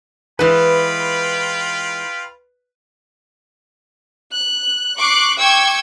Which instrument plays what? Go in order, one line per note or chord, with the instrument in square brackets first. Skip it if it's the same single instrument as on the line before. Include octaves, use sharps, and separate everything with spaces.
[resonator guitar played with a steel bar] E3 G#3 [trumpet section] F4 G5 B5 [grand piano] B4
[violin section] F#6
C#6 D6 F#6 C7
G5 C#6 D6 E6 G#6